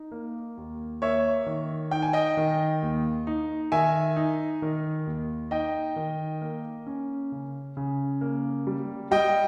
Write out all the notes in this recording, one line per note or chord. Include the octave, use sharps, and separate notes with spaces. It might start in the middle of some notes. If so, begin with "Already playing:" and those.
Already playing: D#4
A#3
D#2
A#3 C#5 E5
D#3
D#4 G5
G#5
D#5 G5
D#3
D#2
D#4
D#3 E5 G#5
D#4
D#3
D#2
D#4 D#5 G5
D#3
A#3
C#4
C#3
C#3
A#3
G3
G3 D#5 G5